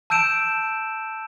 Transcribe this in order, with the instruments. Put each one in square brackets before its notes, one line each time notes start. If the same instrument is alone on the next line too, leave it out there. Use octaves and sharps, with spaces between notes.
[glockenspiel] A5 E6 G6 D7 E7